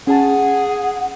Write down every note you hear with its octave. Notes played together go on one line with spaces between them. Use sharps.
C#4 G#4 F#5 A5